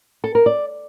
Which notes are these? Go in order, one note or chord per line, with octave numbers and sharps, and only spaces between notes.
A4
A#4
D5